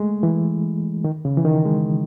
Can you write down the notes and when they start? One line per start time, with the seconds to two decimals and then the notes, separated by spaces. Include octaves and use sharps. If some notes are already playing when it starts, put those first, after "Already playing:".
Already playing: G#3 A3
0.23 E3
1.04 D#3
1.25 C#3
1.37 E3
1.45 D#3
1.65 G#3